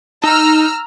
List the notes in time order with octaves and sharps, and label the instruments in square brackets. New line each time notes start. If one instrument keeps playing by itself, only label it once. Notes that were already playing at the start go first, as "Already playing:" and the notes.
[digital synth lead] D#4 [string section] A#5 E6 F6